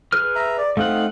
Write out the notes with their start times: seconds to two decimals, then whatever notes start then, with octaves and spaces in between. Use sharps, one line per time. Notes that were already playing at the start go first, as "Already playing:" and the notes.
0.12 G#4 B4 F6
0.35 E5 A#5
0.58 D5
0.77 A3 C4 D#4 F5 F#5